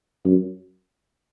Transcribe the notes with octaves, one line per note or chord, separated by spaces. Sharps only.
F#2